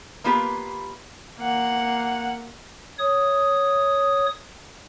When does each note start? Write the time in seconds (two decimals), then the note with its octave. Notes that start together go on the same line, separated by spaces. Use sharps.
0.24 A#3 B3 F4 G4 B4
1.39 A#3 F#5
2.99 C#5 D#6